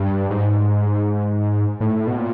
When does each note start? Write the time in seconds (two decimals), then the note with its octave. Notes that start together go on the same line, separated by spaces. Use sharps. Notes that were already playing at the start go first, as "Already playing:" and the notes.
Already playing: G2
0.30 G#2
1.80 A2
2.07 B2
2.18 A#2